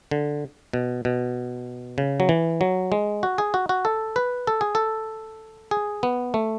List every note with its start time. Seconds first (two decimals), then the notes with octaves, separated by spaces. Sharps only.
0.11 D3
0.73 B2
1.05 B2
1.98 C#3
2.20 F#3
2.29 E3
2.61 F#3
2.92 G#3
3.23 F#4
3.38 G#4
3.54 F#4
3.69 F#4
3.85 A4
4.16 B4
4.47 A4
4.61 G#4
4.75 A4
5.71 G#4
6.03 B3
6.34 A3